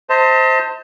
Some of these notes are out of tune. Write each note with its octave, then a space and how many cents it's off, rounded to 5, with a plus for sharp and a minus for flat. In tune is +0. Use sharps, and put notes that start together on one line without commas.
C5 +0 D#5 +45 A5 +35